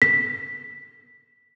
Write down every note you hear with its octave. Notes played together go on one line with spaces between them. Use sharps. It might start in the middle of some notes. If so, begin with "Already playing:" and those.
B6